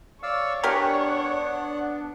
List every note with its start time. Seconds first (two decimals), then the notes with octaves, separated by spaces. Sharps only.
0.23 C#5 D5 F5 E6
0.63 B3 D4 G4 A#4 F#5 G#5